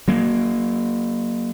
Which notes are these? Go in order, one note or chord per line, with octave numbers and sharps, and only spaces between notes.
F#3 A#3